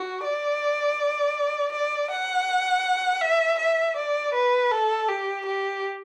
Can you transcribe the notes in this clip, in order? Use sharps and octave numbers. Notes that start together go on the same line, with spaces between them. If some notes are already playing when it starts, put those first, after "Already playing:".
Already playing: F#4
D5
D5
F#5
E5
E5
D5
B4
A4
G4
G4